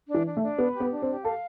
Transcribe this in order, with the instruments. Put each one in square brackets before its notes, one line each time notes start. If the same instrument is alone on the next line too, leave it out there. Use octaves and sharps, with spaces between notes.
[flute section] D4
[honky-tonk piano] E3
[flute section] D4
[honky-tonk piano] A3
[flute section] D4
[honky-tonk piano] B3 [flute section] B4
[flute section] G4
[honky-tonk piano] B3
[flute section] D4
[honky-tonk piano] C4
[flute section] G4
[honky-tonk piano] A4 [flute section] F5